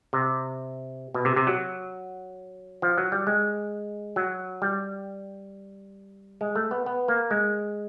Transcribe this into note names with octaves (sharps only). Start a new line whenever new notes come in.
C3
B2
C3
C3
F#3
F3
F#3
G3
G#3
F#3
G3
G#3
A3
B3
B3
A#3
G#3